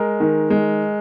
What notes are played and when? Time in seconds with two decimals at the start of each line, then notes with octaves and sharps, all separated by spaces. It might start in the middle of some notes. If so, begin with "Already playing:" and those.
Already playing: G#3 A#4
0.20 D#3
0.50 G#3